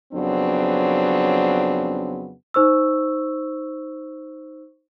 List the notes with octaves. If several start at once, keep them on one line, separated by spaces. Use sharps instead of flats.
F2 C#3 F#3 B3 C4 D4
D#4 C5 C#6 E6